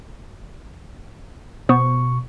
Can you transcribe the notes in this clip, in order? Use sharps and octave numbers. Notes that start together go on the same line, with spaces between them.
B2 B3 C5 C#6